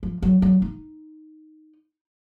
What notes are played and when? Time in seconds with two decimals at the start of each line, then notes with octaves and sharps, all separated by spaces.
0.03 F3
0.22 F#3
0.42 F#3
0.62 D#4